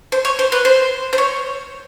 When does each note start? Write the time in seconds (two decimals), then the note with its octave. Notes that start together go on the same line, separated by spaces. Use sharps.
0.12 C5
0.25 C#5
0.39 C5
0.52 B4
0.65 C5
1.13 C5
1.18 C#5